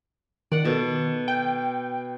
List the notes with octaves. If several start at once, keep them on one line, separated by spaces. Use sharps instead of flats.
D#3 D5 F#5
B2 A4
G5